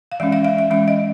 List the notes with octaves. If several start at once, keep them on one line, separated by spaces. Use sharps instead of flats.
F5
E3 G#3 C#4 E5
F5
E5
E5
E3 G#3 C#4 E5
D#5